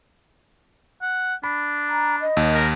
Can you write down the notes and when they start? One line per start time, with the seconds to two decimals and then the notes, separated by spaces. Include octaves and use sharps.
1.02 F#5
1.44 D4 B5
1.89 A#5
2.21 D#5
2.37 D#2
2.54 A#4